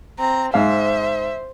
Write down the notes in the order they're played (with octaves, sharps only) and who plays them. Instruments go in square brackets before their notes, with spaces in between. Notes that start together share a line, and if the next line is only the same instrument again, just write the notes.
[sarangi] C4 [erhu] A#5
[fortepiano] G#2 F5 [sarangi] C5 [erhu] E5